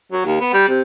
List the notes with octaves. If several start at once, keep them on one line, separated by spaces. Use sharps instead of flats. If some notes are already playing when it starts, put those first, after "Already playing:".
F#3
D#2
B3
G3
C3